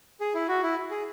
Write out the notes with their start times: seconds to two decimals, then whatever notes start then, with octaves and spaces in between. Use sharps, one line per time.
0.21 G#4
0.34 E4
0.48 F#4
0.63 E4
0.90 G#4